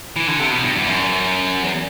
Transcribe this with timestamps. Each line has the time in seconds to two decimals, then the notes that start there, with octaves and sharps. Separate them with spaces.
0.16 E3
0.27 D3
0.39 C3
0.51 B2
0.63 G2
0.76 E2
0.88 F#2
1.63 E2